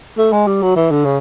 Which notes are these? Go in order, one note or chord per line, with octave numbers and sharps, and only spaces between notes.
A3
G#3
G3
F#3
E3
D3
C#3